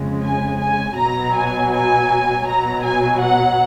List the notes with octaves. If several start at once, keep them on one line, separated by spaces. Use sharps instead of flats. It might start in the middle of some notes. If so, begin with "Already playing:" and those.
Already playing: F2 C#3 G#3
G#5
G#5
B2 F#3 A#5
G#5
G#5
B2 F#3 A#5
G#5
F#5